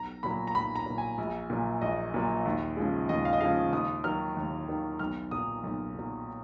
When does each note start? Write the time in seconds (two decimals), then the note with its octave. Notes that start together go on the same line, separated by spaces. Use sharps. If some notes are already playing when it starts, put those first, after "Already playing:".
Already playing: B1 A#5
0.23 A#2 F#3 B5
0.47 A#5
0.55 B1 B5
0.75 A#5
0.86 A#2 F#3
0.98 G#5
1.18 A#1
1.50 A#2 F#3
1.81 A#1 D#5
2.14 A#2 F#3
2.45 D#2
2.77 C#3 F3 G#3
3.09 D#2 D#5
3.25 F5
3.33 D#5
3.41 C#3 F3 G#3 F5
3.72 D#2 D#6
4.04 D#3 F#3 F6
4.37 D#2
4.68 D#3 F#3
4.99 B1 F6
5.31 A#2 F#3 D#6
5.63 B1
5.95 A#2 F#3